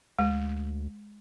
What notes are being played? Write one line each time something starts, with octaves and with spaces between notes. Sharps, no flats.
D2 G#3